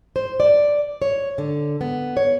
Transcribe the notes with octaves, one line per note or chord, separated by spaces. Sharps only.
C5
D5
C#5
D3
B3
C#5